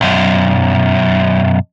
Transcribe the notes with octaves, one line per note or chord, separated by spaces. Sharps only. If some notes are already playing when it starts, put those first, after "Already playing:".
B1 F#2